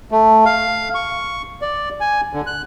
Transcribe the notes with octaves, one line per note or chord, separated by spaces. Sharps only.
A3
F5
C#6
D5
G#5
D3
F#6